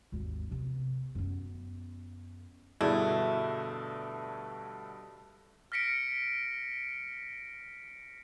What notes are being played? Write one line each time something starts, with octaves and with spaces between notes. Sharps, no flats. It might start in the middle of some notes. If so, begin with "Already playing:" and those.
G#1 D#2
C3 B3
F#2 B3
G2 B2 D3 A3 E4 G#4 D5
F6 A#6 B6 C#7 D7